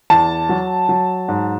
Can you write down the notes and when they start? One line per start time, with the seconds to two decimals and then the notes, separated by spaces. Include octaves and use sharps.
0.10 E2 A5
0.49 F#3
0.89 F#3
1.28 G#2